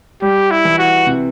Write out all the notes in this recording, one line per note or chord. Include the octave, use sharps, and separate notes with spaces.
G3 G4
E4
E3
F#4
C3